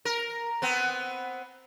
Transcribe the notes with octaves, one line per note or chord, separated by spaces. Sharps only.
A#4
B3 C4